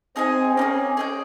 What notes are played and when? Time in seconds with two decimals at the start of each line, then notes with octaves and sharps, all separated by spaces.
0.16 C4 D#4 G#4 D#5 G#5
0.56 A#3 C#4 D#4
0.61 G#4
0.97 G#4 D#5 G5